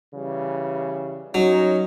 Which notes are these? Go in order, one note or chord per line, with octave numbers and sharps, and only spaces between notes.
C#3 E3 G3
F#3 C#4 D#4